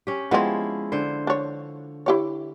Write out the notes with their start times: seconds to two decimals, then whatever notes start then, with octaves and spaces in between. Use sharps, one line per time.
0.07 C#4 G4
0.31 F3 G#3 B3 C4 E4
0.92 D3 C5
1.27 D4 C#5
2.06 E4 G4 C#5